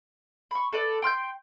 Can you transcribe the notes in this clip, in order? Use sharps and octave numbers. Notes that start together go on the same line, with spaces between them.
B5 C#6
A4 B4 D5
G5 C6 F6 G6